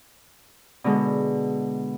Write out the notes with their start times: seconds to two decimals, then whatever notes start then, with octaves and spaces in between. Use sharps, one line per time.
0.84 B2 D3 G#3